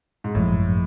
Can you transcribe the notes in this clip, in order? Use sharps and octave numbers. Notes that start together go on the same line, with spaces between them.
G#2
G#1 F#2 A2 F3